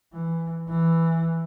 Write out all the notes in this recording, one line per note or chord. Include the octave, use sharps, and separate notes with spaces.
E3
E3